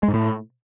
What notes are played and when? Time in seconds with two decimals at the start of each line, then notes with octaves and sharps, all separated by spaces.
0.03 G#3
0.08 G#2
0.14 A2